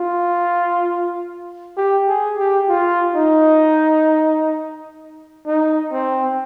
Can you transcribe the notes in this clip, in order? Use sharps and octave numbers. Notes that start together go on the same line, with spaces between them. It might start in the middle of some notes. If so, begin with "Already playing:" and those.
Already playing: F4
G4
G#4
G4
F4
D#4
D#4
C4